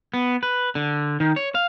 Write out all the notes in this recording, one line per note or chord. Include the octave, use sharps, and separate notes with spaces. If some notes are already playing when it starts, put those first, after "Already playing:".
B3
B4
D3
D#3
C#5
F5